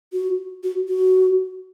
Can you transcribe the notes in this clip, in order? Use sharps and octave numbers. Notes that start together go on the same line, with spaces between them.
F#4
F#4
F#4